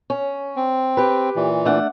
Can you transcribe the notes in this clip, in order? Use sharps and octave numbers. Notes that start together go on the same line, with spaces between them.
C#4
C4
G4 B4
A#2 E3
A3 D4 F#5